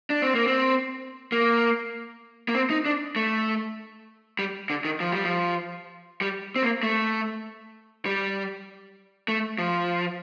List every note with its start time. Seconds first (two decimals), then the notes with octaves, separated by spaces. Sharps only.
0.10 D4
0.22 C4
0.35 A#3
0.47 C4
1.32 A#3
2.48 A#3
2.55 C4
2.70 D#4
2.86 D4
3.16 A3
4.39 G3
4.70 D3
4.84 D#3
5.00 F3
5.12 G3
5.24 F3
6.21 G3
6.56 C4
6.63 A#3
6.83 A3
8.06 G3
9.28 A3
9.59 F3